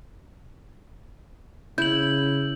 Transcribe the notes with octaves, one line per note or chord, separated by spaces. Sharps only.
C#3 E4 G6 F#7